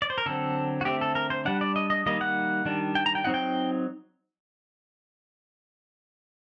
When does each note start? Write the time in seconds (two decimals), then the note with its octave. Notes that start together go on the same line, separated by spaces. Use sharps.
0.02 D5
0.10 C5
0.18 A#4
0.26 D3 F#3 C4 A4
0.81 F#4
0.85 D3 A3 C4 G4
1.01 A4
1.15 A#4
1.30 C5
1.45 G3 D4 F#5
1.61 D5
1.76 D#5
1.90 D#5
2.06 D#3 G3 A#3 D#4 D#5
2.21 F#5
2.65 D#3 G3 D4
2.95 G5
3.06 A#5
3.15 G5
3.24 F#3 C4 D#4 F#5
3.34 G5